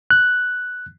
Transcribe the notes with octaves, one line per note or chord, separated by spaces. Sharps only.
F#6